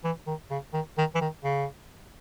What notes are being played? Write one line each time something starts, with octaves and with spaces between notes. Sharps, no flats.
E3
D#3
C#3
D#3
D#3
E3
D#3
C#3